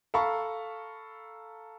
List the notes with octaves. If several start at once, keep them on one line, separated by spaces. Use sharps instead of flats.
A4 F5 A#5 B5 C#6